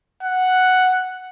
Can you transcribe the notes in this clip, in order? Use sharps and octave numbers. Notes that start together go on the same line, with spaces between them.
F#5